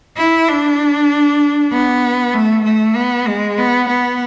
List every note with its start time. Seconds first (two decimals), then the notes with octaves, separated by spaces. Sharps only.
0.17 E4
0.48 D4
1.72 B3
2.34 A3
2.65 A3
2.95 B3
3.27 G#3
3.58 B3
3.88 B3